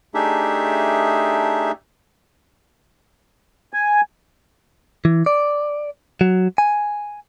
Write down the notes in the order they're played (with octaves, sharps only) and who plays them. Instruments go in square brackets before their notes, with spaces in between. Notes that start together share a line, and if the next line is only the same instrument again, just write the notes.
[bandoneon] A3 D4 D#4 G4 G#4 E5
[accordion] G#5
[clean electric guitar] E3
D5
F#3
G#5